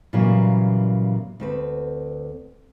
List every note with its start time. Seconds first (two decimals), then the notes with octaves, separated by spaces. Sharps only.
0.13 A#2 C#3 E3 F#3 G3 A#3
1.40 D2 C4 B4